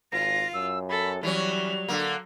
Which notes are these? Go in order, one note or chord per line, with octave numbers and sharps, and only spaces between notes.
G#1 F4 A#6
F#2 E6
A4 B5
E3 F#3 G3 C#4 F7
D3 A#3